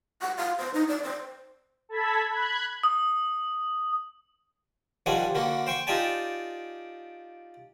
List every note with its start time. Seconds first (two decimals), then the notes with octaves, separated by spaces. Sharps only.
0.21 F#5
0.38 F5
0.59 C5
0.74 D#4
0.88 D5
1.03 C5
1.89 A4 A5 B5 G#6 B6
2.29 B5 F#6 G#6
2.83 D#6
5.06 D#3 F3 G3 D4 F#5 G#5
5.35 D3 A#3 F#4
5.67 C5 G5 C#6
5.87 D#4 F4 G4 D5 G#5 A5